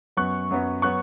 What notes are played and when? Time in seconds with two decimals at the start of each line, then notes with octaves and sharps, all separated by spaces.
0.17 F#2 F#3 B3 C#6 F#6
0.51 F#2 F#3 B3
0.82 F#3 B3 C#6 F#6